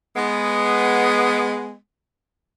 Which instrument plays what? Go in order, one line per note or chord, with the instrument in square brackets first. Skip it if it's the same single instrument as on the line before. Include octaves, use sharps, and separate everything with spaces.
[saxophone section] G#3 B3